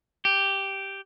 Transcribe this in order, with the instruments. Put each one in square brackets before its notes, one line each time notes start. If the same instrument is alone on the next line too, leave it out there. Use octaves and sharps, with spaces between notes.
[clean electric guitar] G4